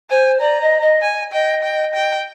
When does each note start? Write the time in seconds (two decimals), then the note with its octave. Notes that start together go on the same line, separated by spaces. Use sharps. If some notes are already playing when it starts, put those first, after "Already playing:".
0.10 C5 G#5
0.40 D5 A#5
0.61 D#5
0.81 D#5
1.01 G#5
1.32 D#5 G5
1.63 G5
1.94 G5